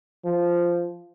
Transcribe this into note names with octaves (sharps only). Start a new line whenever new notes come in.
F3